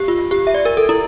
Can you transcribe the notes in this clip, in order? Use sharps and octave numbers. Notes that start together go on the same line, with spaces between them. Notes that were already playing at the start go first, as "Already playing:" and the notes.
Already playing: G4
F4
G4
E5
D5
A#4
A4
E4